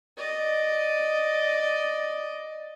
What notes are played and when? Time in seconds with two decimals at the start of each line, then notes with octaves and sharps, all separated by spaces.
0.17 D5 D#5